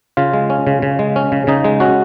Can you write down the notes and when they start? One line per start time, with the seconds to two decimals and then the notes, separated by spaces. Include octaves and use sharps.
0.17 C#3 F4
0.33 G#3
0.50 C#4
0.67 C#3
0.82 C#3
0.99 G#3
1.16 C#4
1.32 C#3
1.47 C#3 D#4
1.64 G#3
1.80 C#4 F#4